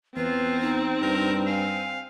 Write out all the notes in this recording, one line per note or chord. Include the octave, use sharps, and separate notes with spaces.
E2 C4 F4 B4
D#4
G2 A#4
F5 G#5